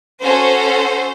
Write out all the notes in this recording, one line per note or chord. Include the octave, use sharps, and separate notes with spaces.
C#4 F#4 A4 C5